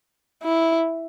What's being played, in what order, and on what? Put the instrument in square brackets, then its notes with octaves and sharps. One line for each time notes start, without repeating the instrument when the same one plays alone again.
[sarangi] E4